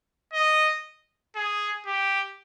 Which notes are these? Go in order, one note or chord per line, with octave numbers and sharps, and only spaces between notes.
D#5
G#4
G4